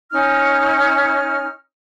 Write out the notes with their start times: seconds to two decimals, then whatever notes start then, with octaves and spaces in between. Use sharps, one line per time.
0.11 C#4 D#4 F6